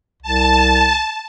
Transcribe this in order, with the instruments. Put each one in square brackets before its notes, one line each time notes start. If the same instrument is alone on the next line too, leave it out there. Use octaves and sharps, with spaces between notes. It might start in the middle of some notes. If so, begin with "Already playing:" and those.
[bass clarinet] C2 [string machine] A5